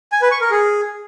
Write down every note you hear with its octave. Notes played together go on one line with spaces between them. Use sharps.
G#5
B4
C#6
A#4
G#4